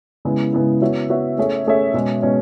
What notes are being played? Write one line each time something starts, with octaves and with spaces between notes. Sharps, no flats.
C#3 G#3 B3 E4
C#3 G#3 B3 E4
B3 F#4 C#5 E5
B3 F#4 C#5 E5
A3 C#4 G#4 C#5 E5
A3 C#4 G#4 C#5 E5
B2 G#3 C#4
B2 G#3 C#4